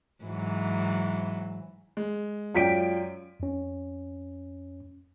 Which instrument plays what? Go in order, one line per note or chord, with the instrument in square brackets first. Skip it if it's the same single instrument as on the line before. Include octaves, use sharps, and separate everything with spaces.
[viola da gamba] G#2 E3 F#3
[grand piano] G#3
[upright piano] F#2 B6 D7 [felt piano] F4 D5 G5
[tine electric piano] F2 C#4